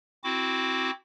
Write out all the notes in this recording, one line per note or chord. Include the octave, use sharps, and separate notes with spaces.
C4 E4 F#4 D6